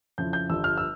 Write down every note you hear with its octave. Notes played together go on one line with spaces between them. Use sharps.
F2 C#3 F3 C4 E4 G6
G6
G1 G2 F3 E6
F6
E6